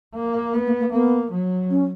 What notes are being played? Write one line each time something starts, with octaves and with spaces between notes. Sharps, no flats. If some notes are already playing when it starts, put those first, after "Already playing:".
A#3
A#3 B3
A#3
A#3
A#3 B3
F#3
C#4